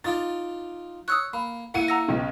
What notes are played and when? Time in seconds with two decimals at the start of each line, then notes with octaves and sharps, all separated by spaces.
0.04 D#4 F4 D6 A6
1.08 C#5 D#6 E6 F#6
1.33 A#3 B5
1.74 A#3 E4 F#5 C#7 D#7
1.88 A#5 E6 A#6
2.08 B1 C#3 G4